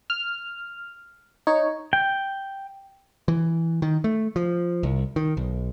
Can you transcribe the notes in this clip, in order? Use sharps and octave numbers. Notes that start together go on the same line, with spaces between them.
F6
D#4 C#5
G5
E3
D#3
A3
F3
C2
D#3
B1